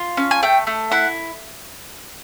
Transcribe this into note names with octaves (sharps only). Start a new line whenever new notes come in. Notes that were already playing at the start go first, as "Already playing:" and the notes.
Already playing: F4
C#4
G#5
A3 G5
A3
E4 F#5